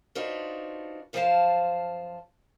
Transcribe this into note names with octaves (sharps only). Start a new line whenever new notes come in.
D4 D#4 F4 F#4 B4 C5
F#2 F3 F4 C5 F5 A5